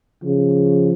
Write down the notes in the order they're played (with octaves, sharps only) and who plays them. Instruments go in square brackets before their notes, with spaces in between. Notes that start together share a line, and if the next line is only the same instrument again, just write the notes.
[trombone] C#3 [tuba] F3